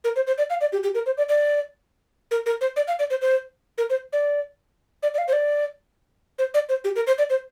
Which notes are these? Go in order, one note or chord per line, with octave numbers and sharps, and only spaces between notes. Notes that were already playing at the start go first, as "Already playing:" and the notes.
A#4
C5
C5
D5
F5
D5
G4
G4
A#4
C5
D5
D5
A#4
A#4
C5
D5
F5
D5
C5
C5
A#4
C5
D5
D5
D5
F5
C5
D5
C5
D5
C5
G4
A#4
C5
D5
C5